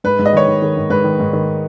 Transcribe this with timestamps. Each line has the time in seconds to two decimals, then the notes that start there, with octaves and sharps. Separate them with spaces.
0.04 G#2 B4
0.19 G#2
0.26 D#5
0.33 D#3 C#5
0.48 D#3
0.62 D#3
0.77 G#2
0.90 G#2 B4
1.04 D#3
1.20 G#2
1.33 D#3